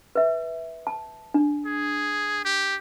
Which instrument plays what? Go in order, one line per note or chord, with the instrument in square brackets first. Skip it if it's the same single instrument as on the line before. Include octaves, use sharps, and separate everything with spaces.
[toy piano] B4 E5
A5
D4
[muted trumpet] G#4
G4